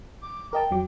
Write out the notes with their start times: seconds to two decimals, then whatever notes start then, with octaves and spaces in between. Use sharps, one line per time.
0.22 D6
0.53 A#4 D#5 G5 A5
0.71 F2 F#3 D6